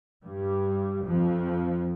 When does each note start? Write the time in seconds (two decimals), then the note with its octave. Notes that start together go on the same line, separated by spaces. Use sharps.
0.24 G2 G3
1.06 F2 F3